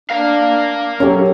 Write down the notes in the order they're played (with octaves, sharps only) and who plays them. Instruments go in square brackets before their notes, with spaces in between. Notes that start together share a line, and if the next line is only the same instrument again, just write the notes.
[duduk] D4 [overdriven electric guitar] A#4 F5
[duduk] F#3 [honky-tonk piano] C#4 A4 [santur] G4 C#5